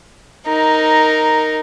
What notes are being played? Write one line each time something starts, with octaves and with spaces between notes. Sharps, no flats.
D#4 A#4